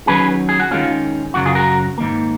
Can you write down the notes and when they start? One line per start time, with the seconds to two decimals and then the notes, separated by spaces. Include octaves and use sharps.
0.07 D#3 F#3 C#4 G#4 B4
0.49 G#4
0.60 F#4
0.71 D#3 G#3 C#4 F4
1.34 F#2 C#3 F#3 F#4
1.45 F4 G#4
1.55 F#4 A#4
1.98 G#2 D#3 A#3